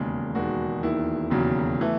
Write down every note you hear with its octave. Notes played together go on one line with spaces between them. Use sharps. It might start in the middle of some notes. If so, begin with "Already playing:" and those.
Already playing: E1 D#2 C#3 G#3
E1 D#2 D#3 G#3 F#4
E1 D#2 D#3 E4
E1 D#2 C#3 F#3
E3 A3